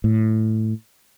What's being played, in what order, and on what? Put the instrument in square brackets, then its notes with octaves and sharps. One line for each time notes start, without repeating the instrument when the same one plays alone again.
[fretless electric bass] A2